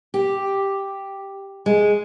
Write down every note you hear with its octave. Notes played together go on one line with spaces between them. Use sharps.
G4
G#3